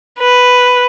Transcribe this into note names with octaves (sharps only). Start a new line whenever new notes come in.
B4